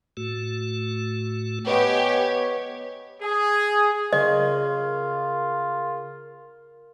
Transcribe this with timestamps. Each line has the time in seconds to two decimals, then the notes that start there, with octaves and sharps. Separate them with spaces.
0.17 A2 A3 F#4
1.67 B3 G4 B4 C#5 D#5 F#5 G#5
3.22 G#4
4.13 C#3 F4 A#4 D#5